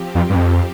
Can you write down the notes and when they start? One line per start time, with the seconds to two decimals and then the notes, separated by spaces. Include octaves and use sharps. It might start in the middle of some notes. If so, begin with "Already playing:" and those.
Already playing: F3 C4 G4
0.15 F2
0.30 G2
0.35 F2